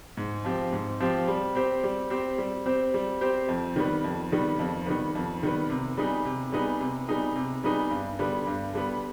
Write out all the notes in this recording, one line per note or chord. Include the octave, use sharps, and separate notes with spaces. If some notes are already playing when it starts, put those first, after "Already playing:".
G#2
F3 C4 G4
G#2
F3 C4 G4
G3
C4 G4 C5
G3
C4 G4 C5
G3
C4 G4 C5
G3
C4 G4 C5
F2
D#3 G3 B3
F2
D#3 G3 B3
F2
D#3 G3 B3
F2
D#3 G3 B3
C3
G3 B3 D#4 G#4
C3
G3 B3 D#4 G#4
C3
G3 B3 D#4 G#4
C3
G3 B3 D#4 G#4
G2
D3 G3 B3
G2
D3 G3 B3